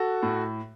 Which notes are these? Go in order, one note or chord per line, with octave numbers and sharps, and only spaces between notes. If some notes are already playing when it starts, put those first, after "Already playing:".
Already playing: F#4 A4
A2